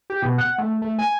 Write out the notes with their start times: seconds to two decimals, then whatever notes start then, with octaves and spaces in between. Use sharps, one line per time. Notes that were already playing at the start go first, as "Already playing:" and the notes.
0.10 G4
0.22 B2
0.38 F#5
0.58 A3
0.82 A3
0.99 G#5